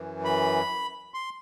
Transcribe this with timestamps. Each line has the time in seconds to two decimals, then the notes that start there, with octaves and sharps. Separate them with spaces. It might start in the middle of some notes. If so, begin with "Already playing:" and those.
Already playing: F#2 E3
0.25 B5
1.14 C6